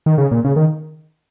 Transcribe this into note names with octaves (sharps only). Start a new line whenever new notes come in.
D#3
C#3
A#2
C#3
D#3